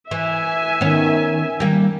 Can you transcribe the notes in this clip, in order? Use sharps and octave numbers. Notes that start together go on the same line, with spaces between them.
E3 E5 G#5
D#3 B3 C#4
D#3 G3 A#3